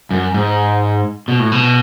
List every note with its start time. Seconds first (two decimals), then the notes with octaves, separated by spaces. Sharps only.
0.11 F#2
0.34 G#2
1.28 B2
1.40 A2
1.52 B2